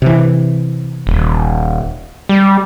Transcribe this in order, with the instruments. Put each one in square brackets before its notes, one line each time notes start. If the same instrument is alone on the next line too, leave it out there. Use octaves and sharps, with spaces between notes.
[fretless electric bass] C3 E3
[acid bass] D#1
G3